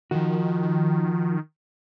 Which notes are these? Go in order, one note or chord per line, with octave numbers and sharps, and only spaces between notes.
D#3 F3 F#4